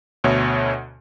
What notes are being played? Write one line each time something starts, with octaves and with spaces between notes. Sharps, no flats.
D2 B2 C#5 E5